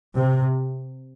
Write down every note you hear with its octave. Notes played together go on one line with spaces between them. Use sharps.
C3